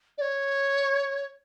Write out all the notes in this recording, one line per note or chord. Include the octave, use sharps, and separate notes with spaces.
D5
C#5